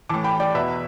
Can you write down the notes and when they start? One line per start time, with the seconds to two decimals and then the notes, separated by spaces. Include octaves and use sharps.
0.09 A2 E3 A5 D6
0.24 G5 B5
0.40 D5 G5
0.54 E2 B2 B4 E5